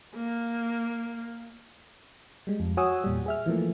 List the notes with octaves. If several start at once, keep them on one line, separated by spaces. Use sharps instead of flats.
A#3
G3 G#3
F2
F#4 C#5 F#5 G#5 D#6 E6
E2 A#2 G3
G#4 E5 F6
E3 F3 A3 A#3